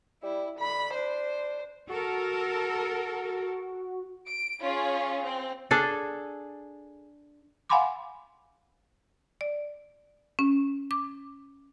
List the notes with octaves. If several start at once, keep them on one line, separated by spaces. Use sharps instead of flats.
G3 E4
D3 B5
D4 C5
F#4 A4 A#4
D7
C#4 F4 G#4
C4
D4 G#4 A4
F5 F#5 G#5 B5 C6 D6
D5
C#4
D6